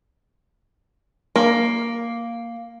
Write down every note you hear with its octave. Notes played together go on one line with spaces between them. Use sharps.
A#3